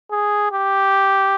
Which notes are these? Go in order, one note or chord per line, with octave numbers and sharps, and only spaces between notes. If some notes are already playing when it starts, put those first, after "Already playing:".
G#4
G4